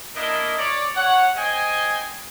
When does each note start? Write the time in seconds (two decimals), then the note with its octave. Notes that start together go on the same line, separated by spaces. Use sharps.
0.15 A#3 D4 E4 A#4 D#5
0.58 C#5 D5
0.95 C#5 F#5
1.36 C5 D#5 G5 G#5